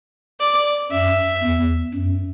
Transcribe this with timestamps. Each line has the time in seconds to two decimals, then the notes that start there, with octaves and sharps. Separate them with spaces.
0.40 D5
0.92 F#2 E5
1.43 E2
1.94 F#2